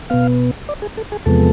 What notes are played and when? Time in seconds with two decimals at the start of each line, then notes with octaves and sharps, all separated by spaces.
0.10 B2 B3 F5
0.69 D5
0.82 G#4
0.97 A4
1.12 G#4
1.26 E2 C3 F3 G#3 B3 A4